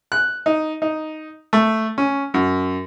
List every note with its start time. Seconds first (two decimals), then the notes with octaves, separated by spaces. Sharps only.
0.12 F#6
0.46 D#4
0.82 D#4
1.53 A3
1.98 C#4
2.34 F#2